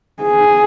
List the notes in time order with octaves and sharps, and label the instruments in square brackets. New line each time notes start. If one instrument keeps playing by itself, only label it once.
[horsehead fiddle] G#4